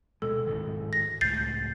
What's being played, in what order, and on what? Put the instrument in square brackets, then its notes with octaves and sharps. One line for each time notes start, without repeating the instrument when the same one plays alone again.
[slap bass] D2 B2 G#3 [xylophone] A4
[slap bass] D1 G#2 D#3
[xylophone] A#6
[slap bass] C#2 A2 G#3 [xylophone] G6 A6 C7